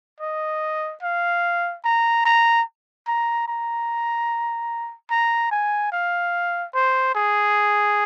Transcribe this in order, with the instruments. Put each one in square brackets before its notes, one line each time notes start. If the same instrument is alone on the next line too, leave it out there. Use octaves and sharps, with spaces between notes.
[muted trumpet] D#5
F5
A#5
A#5
A#5
A#5
A#5
G#5
F5
C5
G#4